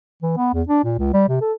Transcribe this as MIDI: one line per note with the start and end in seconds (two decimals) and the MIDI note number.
0.22 0.32 52
0.37 0.50 59
0.53 0.63 40
0.69 0.82 62
0.84 0.98 46
0.98 1.09 37
1.13 1.26 55
1.28 1.37 48
1.41 1.53 69